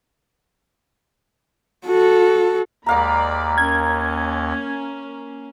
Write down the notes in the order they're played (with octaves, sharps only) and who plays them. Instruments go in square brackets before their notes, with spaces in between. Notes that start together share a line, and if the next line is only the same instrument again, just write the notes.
[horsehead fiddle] F#4 A4
[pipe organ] D#2 [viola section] G#3 D5 B5 [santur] A#4 F5 A#5
[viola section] A#3 C#4 [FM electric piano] G#6